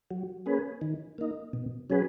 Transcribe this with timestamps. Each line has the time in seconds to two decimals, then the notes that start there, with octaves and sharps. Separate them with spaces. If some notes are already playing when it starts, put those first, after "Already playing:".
0.11 F#3
0.46 A#3 C#4 G#4 B4
0.81 D#3
1.18 A#3 D#4
1.53 B2
1.90 F#3 C#4 G#4 B4